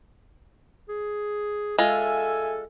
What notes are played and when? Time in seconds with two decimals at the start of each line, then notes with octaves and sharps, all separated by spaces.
0.89 G#4
1.78 G#3 F4 A4 E5 G#5